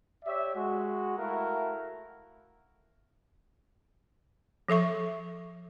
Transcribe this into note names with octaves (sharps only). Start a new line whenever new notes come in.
G4 C#5 D5 E5
G#3 F#4
A3 E4 F#4 A#4 F5 F#5
F3 A4 E5 C#6